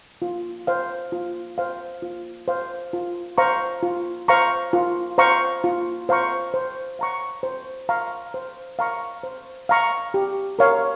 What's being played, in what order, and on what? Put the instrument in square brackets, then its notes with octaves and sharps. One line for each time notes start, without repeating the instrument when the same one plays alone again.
[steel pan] F4
C5 F5
F4
C5 F5
F4
C5 F5
F4
C5 F5 A#5 C#6
F4
C5 F5 A#5 C#6
F4
C5 F5 A#5 C#6
F4
C5 F5 A#5 C#6
C5
F5 A#5 C#6
C5
F5 A#5 C#6
C5
F5 A#5 C#6
C5
F5 A#5 C#6
G4
A#4 C#5 F5